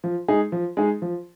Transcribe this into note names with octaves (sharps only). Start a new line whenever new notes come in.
F3
G#3 D#4 G#4
F3
G#3 D#4 G#4
F3